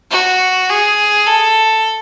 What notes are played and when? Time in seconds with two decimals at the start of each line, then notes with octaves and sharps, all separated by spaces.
0.11 F#4
0.69 G#4
1.26 A4